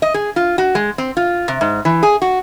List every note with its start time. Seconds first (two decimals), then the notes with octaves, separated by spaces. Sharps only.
0.02 D#5
0.14 G#4
0.36 F4
0.58 F#4
0.75 G#3
0.98 C4
1.17 F4
1.48 C3
1.61 G#2
1.85 E3
2.03 G#4
2.22 F#4